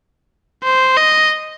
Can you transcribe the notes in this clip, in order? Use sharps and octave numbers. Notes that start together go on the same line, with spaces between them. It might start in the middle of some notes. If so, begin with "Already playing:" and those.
C5
D#5